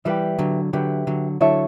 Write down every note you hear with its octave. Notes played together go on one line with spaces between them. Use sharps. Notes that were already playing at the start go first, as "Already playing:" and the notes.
E3 G3 G4 B4 E5
D3 F#3
D3 F#3 G4 B4 E5
D3 F#3
D3 F#3 E4 A4 C#5 E5